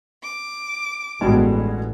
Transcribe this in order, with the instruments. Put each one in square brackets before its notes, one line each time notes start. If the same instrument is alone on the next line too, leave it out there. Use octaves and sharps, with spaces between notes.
[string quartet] D6
[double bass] A1 [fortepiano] G2 B2 G#3